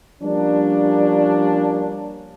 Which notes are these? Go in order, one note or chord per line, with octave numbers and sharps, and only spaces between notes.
F3 G3 A#3 C#4 D4